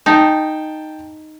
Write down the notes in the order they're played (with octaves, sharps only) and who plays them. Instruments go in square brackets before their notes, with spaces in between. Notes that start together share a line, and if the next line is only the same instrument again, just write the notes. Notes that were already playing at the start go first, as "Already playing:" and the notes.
[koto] D#4 [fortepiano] G5 A5